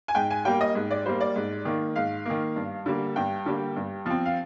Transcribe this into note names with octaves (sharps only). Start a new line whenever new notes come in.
G#5
G#2 G5
G#5
G3 A#3 G5
D#5
G#2
D5
G3 A#3 C5
D5
G#2
D#3 A#3
G#2 F5
D#3 A#3
G2
D3 G3 A#3
G2 G5
D3 G3 A#3
G2
F3 C4
F5